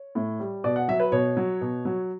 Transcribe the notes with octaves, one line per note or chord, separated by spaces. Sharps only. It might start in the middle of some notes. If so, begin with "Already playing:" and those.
Already playing: C#5
A2
G3
B2 D5
F#5
F#3 E5
B4
B2 C#5
F#3
B2
F#3